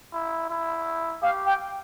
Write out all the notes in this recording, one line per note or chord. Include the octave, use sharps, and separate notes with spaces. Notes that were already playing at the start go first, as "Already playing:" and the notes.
E4
E4
G4 F5
G5